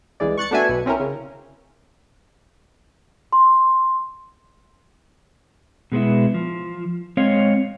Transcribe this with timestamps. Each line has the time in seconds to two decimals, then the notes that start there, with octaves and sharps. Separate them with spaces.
0.20 C2 E3 G#3 D5
0.38 C#6 F#6 A6 C#7
0.51 A3 B3 D4 F#4 E5 G#5
0.69 B1 B2
0.86 C4 C#4 E4 A#4
1.00 C#3
3.33 C6
5.92 B2 G#3 B3 E4
6.34 F3
7.17 G#3 C4 C#5 D#5 F5